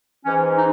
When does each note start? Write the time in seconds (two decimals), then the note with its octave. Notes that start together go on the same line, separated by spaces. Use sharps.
0.25 G#2 E3 C#4
0.56 D#4